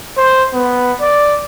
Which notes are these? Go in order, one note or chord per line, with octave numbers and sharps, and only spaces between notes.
C5
B3
D5